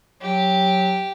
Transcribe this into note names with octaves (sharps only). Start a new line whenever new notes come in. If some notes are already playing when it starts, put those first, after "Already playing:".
F#3 G4